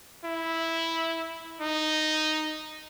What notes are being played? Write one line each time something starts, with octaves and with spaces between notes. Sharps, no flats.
E4
D#4